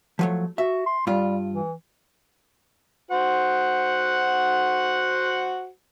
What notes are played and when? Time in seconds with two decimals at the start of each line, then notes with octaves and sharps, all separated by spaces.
0.19 F3 F#3 A3
0.58 F#4 E5
0.86 C6
1.07 G2 G3 F4
1.54 E3
3.11 F#4 C5 F#5